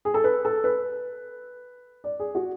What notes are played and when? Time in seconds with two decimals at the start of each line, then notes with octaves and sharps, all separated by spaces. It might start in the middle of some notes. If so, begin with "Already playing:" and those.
0.05 G#4
0.14 A4
0.24 B4
0.45 A4
0.64 B4
2.04 D5
2.20 G#4
2.35 F#4